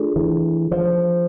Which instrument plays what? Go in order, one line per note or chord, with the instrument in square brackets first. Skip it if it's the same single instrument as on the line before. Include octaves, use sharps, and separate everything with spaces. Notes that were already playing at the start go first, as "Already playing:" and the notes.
Already playing: [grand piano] A3 D4 F4 G#4
[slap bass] E3
F3